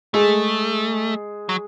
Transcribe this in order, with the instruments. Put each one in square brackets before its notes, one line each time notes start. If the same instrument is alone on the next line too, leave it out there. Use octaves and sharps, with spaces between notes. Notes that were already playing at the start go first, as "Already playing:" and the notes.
[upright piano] G#3 G#4 [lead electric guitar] A3
[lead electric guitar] F#3